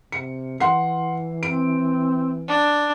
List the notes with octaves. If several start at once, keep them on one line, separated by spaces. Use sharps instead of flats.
C3 C#7
E3 F#5 C6 C7
C4 D7
D4